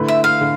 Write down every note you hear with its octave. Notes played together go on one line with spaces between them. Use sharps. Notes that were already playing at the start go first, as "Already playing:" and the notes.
Already playing: D3 A3 E4 B4
E5
F5
D3